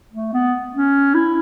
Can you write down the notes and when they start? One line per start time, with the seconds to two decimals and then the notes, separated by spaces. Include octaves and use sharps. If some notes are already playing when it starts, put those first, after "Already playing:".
0.12 A3
0.33 B3
0.74 C#4
1.14 E4